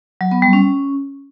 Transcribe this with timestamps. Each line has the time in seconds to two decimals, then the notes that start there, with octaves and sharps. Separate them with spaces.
0.21 F#3
0.31 B3
0.42 G3
0.53 C#4